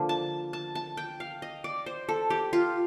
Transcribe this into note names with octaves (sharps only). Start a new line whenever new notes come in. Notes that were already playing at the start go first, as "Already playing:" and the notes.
Already playing: D3 F3 A#3
A5
A5
A5
G5
F5
D#5
D5
C5
A4
G4
F4